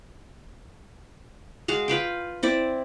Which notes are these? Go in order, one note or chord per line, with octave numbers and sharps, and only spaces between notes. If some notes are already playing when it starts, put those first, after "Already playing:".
G#3 F#4 G#4 F5
F4 B4 F5 G5
C4 E4 D5